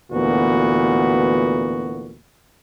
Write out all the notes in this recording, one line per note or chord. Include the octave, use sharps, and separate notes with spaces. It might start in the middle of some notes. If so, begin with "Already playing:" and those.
D2 A#2 E3 B3 F#4